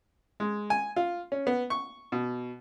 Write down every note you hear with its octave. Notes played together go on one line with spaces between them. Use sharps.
G#3
G#5
F4
C#4
B3
C#6
B2